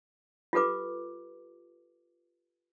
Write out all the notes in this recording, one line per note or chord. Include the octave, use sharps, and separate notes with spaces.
F4 G4 A4 B4 D6